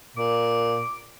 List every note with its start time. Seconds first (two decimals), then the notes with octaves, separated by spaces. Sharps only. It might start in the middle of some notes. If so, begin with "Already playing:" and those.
0.17 A#2 D6